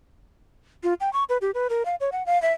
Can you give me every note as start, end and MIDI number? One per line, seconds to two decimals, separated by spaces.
0.83 0.94 65
1.00 1.12 79
1.13 1.24 85
1.29 1.38 71
1.41 1.51 67
1.54 1.67 71
1.70 1.85 70
1.85 1.95 77
2.00 2.10 73
2.12 2.25 78
2.26 2.41 77
2.42 2.53 76